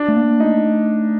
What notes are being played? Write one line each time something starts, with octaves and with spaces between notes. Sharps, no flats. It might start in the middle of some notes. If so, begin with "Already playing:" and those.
Already playing: D4
A3
A#3
A3 D#4